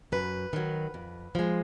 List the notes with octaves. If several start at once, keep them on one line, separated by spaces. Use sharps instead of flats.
F#2 B4
D#3 F#3
F2
F3 G#3